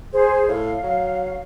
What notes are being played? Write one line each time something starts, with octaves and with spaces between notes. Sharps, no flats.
G#4 C5
A2 F5
F#3